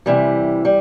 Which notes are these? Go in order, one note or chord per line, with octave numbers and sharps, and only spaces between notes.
C3 E3 G3
G3